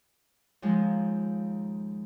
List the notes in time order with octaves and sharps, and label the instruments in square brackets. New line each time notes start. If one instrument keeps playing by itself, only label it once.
[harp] D#2 F3 G#3